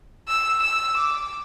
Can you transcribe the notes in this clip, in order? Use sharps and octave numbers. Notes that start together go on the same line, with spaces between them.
E6
E6
D6